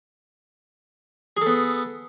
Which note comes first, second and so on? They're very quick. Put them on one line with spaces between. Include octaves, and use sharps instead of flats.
G#4 A4 B3